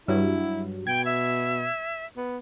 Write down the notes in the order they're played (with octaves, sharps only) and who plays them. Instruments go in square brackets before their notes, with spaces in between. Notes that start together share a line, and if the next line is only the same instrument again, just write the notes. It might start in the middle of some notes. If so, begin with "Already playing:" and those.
[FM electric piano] G2 F#3 [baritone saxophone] E4
[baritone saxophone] B2 [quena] G5 [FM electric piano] G#6
[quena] E5
[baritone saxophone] B3